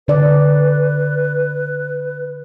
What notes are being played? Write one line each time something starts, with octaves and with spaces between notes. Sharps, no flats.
D3 B4 D5